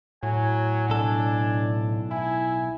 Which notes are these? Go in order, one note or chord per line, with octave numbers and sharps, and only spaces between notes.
A2 F#3 G#5
B1 D4 A4
E4 G#5